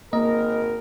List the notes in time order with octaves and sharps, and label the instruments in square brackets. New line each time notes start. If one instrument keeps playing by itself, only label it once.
[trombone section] G#1 A#4 [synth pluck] A#3 [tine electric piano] D#5